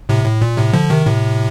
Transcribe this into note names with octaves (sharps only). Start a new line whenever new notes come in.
A2 C3
A2
A#2
A2 C3
D3 F3
C3 D#3
A2 C3